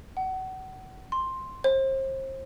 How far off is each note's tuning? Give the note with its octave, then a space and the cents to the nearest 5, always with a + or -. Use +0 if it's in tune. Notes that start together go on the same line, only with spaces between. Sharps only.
F#5 +30
C6 +5
C5 +35